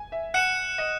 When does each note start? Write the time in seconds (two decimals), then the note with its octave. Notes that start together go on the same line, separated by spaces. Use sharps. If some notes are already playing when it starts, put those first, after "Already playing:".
Already playing: G#5
0.12 E5
0.34 F#5 F#6 C#7 E7
0.78 D#5